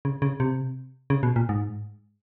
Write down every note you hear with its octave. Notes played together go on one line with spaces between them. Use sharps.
C#3
C#3
C3
C#3
B2
A#2
G#2